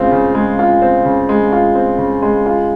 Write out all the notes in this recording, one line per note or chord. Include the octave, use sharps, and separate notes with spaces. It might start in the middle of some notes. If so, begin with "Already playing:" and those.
Already playing: C#3 G#3 C4 F4
C#3
G#3
F4
C4
C#3
G#3
F4
C4
C#3
G#3
F4